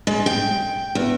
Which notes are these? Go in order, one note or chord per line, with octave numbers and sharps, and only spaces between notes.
G#3
G5
E2